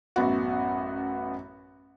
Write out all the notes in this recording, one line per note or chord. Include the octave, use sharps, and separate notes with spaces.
A1 F#2 B3 F#4